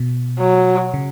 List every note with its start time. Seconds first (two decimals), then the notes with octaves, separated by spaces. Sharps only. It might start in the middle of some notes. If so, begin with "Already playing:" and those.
Already playing: B2
0.39 F#3
0.94 C#3